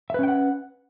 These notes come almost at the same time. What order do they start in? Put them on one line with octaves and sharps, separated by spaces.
E5 B4 C#4 G5 F#5